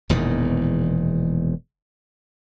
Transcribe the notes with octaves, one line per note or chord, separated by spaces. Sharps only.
E1 E2 A#2 D#3